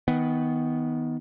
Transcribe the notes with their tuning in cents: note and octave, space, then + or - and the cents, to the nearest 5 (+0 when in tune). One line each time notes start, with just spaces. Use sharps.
D#3 +25 B3 +0